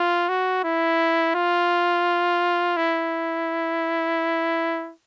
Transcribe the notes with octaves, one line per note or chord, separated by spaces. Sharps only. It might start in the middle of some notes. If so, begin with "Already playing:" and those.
Already playing: F4
F#4
E4
F4
E4